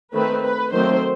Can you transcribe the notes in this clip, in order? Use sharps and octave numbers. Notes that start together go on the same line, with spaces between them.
D#3 A3 C4 B4
B4
D#3 F#3 A3 C4 C5